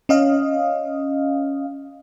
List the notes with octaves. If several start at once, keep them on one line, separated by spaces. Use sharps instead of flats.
C#4 D#5 F5